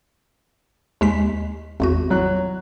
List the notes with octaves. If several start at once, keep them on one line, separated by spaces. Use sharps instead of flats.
D#2 G#3 B6
G#1 E2 F#4
F#3 F#6